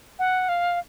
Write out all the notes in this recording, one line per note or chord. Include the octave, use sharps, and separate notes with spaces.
F#5
F5